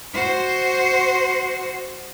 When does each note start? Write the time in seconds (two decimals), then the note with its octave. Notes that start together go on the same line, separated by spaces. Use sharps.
0.14 F#4 C5